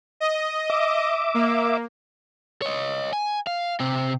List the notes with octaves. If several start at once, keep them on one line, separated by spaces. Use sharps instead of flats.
D#5
E5 D6
A#3
C#5 D#5
G#5
F5
C3 C4